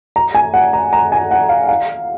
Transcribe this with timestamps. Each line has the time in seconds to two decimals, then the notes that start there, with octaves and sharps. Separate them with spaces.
0.16 A#5
0.35 G#5
0.54 F#5
0.73 A#5
0.93 A#5
1.12 G#5
1.31 F#5
1.49 F5
1.68 F5